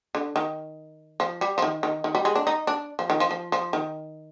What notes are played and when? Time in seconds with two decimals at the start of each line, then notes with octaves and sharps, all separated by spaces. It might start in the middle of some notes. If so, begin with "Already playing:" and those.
0.15 D3
0.36 D#3
1.20 F3
1.41 G3
1.58 F3
1.62 D#3
1.83 D#3
2.04 D#3
2.15 G3
2.25 G#3
2.36 D4
2.47 D#4
2.67 D4
2.99 F3
3.10 D#3
3.20 F3
3.31 F3
3.52 F3
3.73 D#3